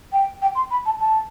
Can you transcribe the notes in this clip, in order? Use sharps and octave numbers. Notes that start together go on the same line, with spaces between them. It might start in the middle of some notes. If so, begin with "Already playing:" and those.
G5
G5
C6
B5
A5
A5